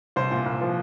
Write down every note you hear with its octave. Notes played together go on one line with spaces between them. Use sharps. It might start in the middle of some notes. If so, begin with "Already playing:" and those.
C2 C5
A#2
C2
F3